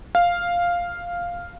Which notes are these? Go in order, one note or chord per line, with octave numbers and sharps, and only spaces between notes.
F5